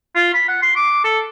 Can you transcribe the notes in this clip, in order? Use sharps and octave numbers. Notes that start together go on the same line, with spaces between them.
F4
B5
F#5
C6
D6
A4